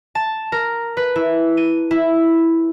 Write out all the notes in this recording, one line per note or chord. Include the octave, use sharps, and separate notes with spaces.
A5
A#4
B4
E4
D#7
E4